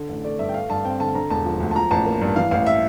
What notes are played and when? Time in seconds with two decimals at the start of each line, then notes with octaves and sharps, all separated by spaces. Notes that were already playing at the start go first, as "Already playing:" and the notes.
Already playing: D3
0.09 A1
0.24 A3 D5
0.39 G2 E5
0.49 G5
0.54 A3 F5
0.70 G2 A5
0.84 C4 G5
1.00 D3 A5
1.15 D3 A#5
1.30 E1 A5
1.45 F3
1.60 D2
1.71 A5
1.76 F3 A#5
1.91 A1 A5
2.06 A#3
2.21 G2
2.36 E3 F5
2.51 A1 F5
2.66 E5